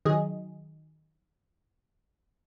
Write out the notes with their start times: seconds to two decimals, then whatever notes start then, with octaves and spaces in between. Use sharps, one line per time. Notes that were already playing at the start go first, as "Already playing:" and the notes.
0.05 D#3 F#3 G#4 D#5